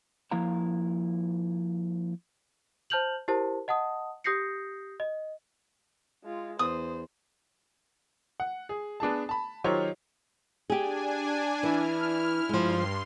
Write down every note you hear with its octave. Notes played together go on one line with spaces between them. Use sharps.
F3 A#3 E4 F5 A#5
C5 A5 F6 G6 F7 F#7
E4 G4 A#4 C5 A5
D#5 F#5 A5 D#6
G4 D#6 G6 A#6 C7 C#7
D#5
G#3 F4
E2 C5 D#6
F#5
G#4
B3 D4 G#4 A5
A5 B5
D#3 F#3 F4 G4 C5 C#5
D4 G4 G#4 G#5
E3 E4 F6
G2 F3 G#3 C6